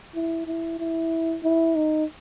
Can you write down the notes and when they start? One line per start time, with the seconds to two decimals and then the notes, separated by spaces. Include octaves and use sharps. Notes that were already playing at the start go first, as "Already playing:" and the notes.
0.15 E4
0.47 E4
0.79 E4
1.43 E4
1.76 D#4